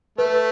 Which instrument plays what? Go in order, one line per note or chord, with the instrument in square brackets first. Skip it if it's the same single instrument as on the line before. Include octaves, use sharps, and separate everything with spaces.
[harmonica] A3 [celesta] B4